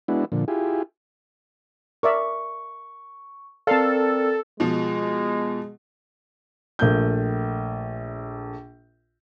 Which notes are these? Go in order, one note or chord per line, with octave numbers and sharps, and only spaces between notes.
G#3 B3 D4 E4 F#4
A#2 D3 F3
E4 F4 G4 G#4
A#4 D5 E5 C#6
C4 A4 A#4 D5 F5 A5
B2 F3 G#3
A#1 A3 A#4 G6